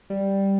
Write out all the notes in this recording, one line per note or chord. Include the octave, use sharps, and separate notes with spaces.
G3